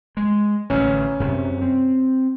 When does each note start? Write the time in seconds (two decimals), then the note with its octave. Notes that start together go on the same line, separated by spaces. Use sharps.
0.17 G#3
0.70 A1 D3 C#4
1.20 F#2 C3
1.62 C4